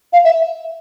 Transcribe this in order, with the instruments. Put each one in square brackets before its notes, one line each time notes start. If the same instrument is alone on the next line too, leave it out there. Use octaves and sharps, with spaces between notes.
[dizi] F5
E5